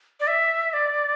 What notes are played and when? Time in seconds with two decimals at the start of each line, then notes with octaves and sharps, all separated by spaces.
0.20 D5
0.27 E5
0.73 D5